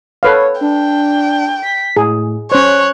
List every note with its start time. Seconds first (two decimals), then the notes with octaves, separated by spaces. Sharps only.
0.23 A4 B4 C#5 F5
0.61 D4 G5
1.62 B6
1.96 A2 G#4
2.52 C#4 C5 C#5 F#6